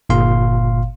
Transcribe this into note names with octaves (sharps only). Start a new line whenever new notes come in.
G1 A#2 F5 C6